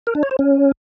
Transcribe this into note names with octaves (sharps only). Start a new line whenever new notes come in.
A#4
D4
C#5
C5
C#4